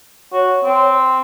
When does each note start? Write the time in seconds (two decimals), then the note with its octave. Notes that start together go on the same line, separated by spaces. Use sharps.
0.33 F#4 C#5
0.65 C4